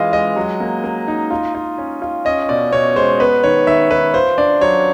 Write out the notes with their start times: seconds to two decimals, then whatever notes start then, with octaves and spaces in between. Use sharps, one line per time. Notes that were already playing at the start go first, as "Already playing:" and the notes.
Already playing: E3 G#3 F4 D#5 F5
0.13 G#3 D#5
0.36 F#3
0.60 A#3
0.84 A#3
1.08 D#4
1.31 F4
1.55 F4
1.78 C#4
2.02 F4
2.25 C#4 D#5
2.49 B2 D5
2.72 B2 C#5
2.96 G#3 C5
3.20 B3 B4
3.44 D#3 C#5
3.67 D#3 E5
3.91 D#3 B4
4.14 F4 C5
4.38 D4 D5
4.61 F#3 C#5